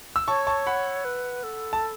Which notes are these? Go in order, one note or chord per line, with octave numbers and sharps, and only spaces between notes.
E6
C#5 A5 C#6
A5 C#6
F#5 B5
B4
A4
A5